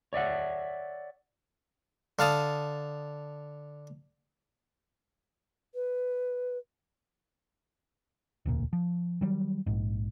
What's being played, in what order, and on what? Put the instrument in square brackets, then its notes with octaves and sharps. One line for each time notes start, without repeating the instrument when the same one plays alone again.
[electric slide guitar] C#5 D5 E5 F#5
[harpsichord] D3 F5 A5 D#6
[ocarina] B4
[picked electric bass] E1 D2 A#2
F3
D#3 F#3 G3
A#1 G#2